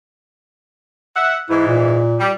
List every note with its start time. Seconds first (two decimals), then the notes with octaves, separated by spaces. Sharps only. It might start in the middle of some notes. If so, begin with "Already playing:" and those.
1.15 E5 F#5
1.49 G#2 E3 E4
1.68 A#2
2.19 G3